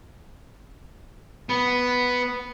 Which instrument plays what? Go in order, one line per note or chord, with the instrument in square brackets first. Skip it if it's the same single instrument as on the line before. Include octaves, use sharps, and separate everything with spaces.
[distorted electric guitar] B3